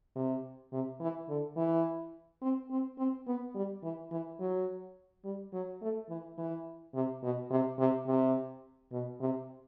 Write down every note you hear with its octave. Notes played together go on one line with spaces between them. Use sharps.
C3
C3
E3
D3
E3
C4
C4
C4
B3
G3
E3
E3
F#3
G3
F#3
A3
E3
E3
C3
B2
C3
C3
C3
B2
C3